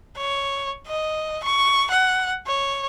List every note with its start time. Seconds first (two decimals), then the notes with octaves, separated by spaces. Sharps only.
0.17 C#5
0.87 D#5
1.44 C#6
1.91 F#5
2.47 C#5